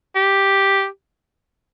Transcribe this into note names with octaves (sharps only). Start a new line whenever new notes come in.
G4